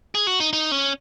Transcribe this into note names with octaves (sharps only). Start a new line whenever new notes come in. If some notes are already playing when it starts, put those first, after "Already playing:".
G#4
F#4
D#4
D#4
C#4